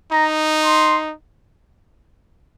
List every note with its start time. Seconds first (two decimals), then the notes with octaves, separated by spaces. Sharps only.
0.12 D#4 A#5
0.65 C6